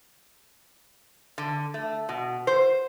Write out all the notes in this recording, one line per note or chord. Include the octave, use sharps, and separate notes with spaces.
D3
A3
B2
C5